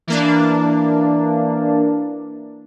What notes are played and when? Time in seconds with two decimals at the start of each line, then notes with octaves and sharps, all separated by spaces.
0.07 E3 A#3 D4